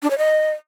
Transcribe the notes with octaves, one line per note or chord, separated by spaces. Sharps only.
D4
C#5
D#5